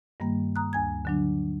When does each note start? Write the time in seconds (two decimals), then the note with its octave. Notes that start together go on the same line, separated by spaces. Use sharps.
0.20 G2 D#3 G3 A#3
0.56 A#5 D#6 F#6
0.73 D2 G#5 G#6
1.05 D3 F#3 D4